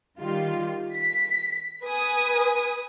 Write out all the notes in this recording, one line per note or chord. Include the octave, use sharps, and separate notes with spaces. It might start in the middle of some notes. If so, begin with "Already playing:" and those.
D#3 G3 F4
B6
B4 G#5 D#6